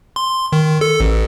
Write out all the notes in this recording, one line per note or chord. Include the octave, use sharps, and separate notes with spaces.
C6
D#3
A4
A1